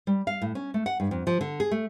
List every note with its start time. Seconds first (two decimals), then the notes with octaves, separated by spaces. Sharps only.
0.07 G3
0.27 F5
0.42 A2
0.55 C#4
0.74 A3
0.86 F#5
1.00 G2
1.11 F2
1.27 F3
1.41 D3
1.60 G#4
1.71 A3